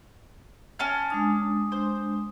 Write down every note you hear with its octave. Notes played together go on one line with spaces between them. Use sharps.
C#4 A5 F6
G#3 D4 D#6
C5